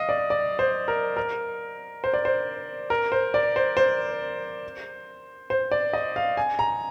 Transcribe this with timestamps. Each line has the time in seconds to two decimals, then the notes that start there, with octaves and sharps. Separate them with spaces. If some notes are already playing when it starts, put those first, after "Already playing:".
Already playing: D#5 F5
0.09 D5
0.30 D5
0.59 C5
0.88 A#4
1.17 A#4
2.04 C5
2.14 D5
2.25 C5
2.90 A#4
3.12 C5
3.34 D5
3.56 C5
3.77 C5
5.50 C5
5.72 D5
5.93 D#5
6.16 F5
6.37 G#5
6.59 A#5